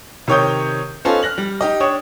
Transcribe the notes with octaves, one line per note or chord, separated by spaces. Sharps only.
C3 D#3 C#5 G5 D#6 G6
B3 C#4 D#4 F4 A4 C5
F6 F#6 A#6 F#7
G3
D#4 G4 D#5
D4 C#5 G5 D#6